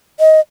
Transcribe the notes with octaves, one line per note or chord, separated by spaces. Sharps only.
D#5